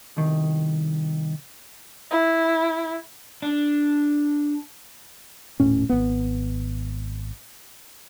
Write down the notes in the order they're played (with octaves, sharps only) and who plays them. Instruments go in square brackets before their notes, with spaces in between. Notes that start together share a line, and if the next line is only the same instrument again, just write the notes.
[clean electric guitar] C2 D#3
[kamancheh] E4
[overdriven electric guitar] D4
[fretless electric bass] D#1 A2 C#4
G#1 B3